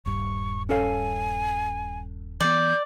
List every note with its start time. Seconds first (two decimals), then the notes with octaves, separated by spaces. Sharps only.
0.06 D#1 G2 C#6
0.69 C#4 A4 F5 G#5
2.40 E3 B3 D5 G6